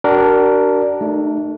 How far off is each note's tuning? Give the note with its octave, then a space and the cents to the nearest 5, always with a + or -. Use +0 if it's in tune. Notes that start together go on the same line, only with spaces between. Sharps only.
D4 +0 F#4 +45 A#4 +0
A3 -10 D#4 -45